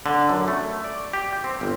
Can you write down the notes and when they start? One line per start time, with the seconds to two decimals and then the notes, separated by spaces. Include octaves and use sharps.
0.06 D3
0.29 F#2
0.48 A3
0.84 D5
1.13 G4
1.44 C4
1.61 G1